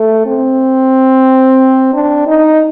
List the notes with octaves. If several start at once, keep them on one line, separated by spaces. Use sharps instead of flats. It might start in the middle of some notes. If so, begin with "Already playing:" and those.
Already playing: A3
C4
D4
D#4